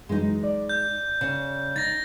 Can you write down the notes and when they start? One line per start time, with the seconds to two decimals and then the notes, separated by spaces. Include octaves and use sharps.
0.09 F#2 E3 F#3 G#3 D#4
0.43 D5
0.69 G6
1.21 C#3
1.76 D#4 A6 A#6